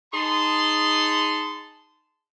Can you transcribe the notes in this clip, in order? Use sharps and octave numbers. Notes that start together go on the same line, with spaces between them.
D#4 G#4 A5 B5 C6